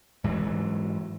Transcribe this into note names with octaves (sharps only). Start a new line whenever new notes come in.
G#2 E3 F#3